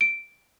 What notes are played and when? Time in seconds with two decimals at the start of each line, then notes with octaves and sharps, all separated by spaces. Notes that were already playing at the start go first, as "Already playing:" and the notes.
0.01 D7